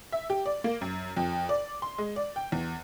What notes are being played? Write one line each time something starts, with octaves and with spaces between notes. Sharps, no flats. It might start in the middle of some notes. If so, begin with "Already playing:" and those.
E5
G4
D5
A#3
F#2
F2
D5
C6
G#3
D5
G5
E2